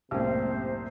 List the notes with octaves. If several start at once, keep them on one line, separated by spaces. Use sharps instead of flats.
C2 F#2 A2 C3 G#3 A#3 C5